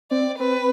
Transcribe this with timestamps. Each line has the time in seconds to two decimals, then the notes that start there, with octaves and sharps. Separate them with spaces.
0.11 C4 D5
0.39 C4 B4